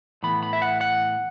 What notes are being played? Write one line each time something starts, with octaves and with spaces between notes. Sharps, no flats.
A2 E3 B3 B5
B5
E5
F#5
F#5